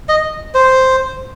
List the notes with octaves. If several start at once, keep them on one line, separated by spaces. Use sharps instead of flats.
D#5
C5